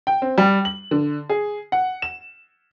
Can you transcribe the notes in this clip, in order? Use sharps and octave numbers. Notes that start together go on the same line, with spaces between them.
G5
C4
G3
F#7
D3
G#4
F#5
E7